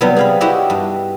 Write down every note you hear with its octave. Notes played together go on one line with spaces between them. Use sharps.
C3 F#3 G3 B3
G#4 F5 B5
E4 F#4 G4 D#5 E5
G2